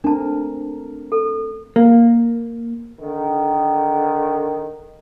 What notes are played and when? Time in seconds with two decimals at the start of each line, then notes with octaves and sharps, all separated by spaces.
0.04 A3 C4 D4 A#4 A5
1.12 A4
1.76 A#3
3.01 D3 D#3